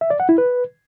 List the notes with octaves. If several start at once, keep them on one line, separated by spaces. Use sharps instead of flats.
E5
D5
F#5
E4
B4